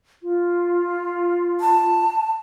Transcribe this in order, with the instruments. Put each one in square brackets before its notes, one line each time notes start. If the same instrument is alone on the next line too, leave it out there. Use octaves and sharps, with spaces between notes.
[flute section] F4
[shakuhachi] A5